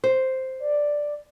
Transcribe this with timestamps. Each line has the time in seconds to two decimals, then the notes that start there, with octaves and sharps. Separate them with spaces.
0.04 C5
0.60 D5